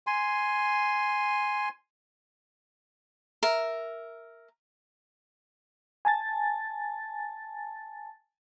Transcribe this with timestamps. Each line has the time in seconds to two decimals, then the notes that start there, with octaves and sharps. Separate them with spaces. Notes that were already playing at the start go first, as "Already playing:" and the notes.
0.07 G#5 C6
3.43 A#4 E5
6.05 G#5 A5 A6